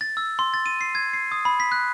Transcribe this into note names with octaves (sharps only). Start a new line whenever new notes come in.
A6
E6
C6
A6
D#7
C7
G#6
C7
D#6
B5
B6
F#6